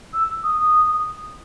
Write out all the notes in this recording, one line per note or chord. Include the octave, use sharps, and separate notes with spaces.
E6
D#6